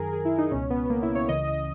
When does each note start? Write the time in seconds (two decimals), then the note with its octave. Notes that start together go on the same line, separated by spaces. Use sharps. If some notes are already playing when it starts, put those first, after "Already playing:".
Already playing: F#2 D#3 G#4 A#4
0.13 G#4
0.25 E4
0.38 D#4
0.51 C#2 B2 C#4
0.70 B3
0.85 B3
0.90 A#3
1.03 E4
1.15 C#5
1.29 C#2 C#3 E3 D#5
1.48 D#5